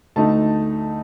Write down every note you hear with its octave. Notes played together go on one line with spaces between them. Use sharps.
D2 D3 A3 D#4 A5